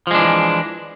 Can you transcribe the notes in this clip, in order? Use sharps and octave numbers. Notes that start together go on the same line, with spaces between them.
E3 F3 G#3 D4